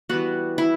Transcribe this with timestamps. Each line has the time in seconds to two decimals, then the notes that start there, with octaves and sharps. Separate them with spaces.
0.09 E3 G3 B3 F#4
0.58 E4